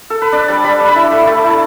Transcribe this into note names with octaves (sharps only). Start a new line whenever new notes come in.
A4
B4
D4 D5
G3 A5
G3 B5
D4
B5
E4
A3
A3 A5
E4
A5